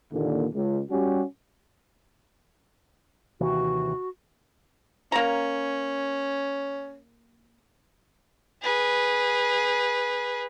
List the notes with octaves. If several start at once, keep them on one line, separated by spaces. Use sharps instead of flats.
D#2 A#2 D3
C#2
G3 C#4 F#4 G4
D#2 C3 E3 F#4
A#3 C#4 A#5
G#4 B4